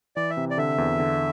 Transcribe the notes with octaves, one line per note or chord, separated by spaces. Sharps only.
E3 D5
E5
C3
D5
D3 E5
E2
D3